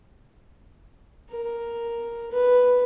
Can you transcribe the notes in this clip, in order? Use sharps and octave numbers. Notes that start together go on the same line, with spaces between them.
A#4
B4